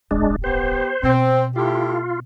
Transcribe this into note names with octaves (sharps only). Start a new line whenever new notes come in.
D1 G1 G#3 D4
B3 G4 C5
B2 C4
A3 E4 F4 G4